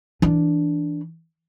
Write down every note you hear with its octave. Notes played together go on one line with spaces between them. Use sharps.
E3 D4